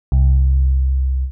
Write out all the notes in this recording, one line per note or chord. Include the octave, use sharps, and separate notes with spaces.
C2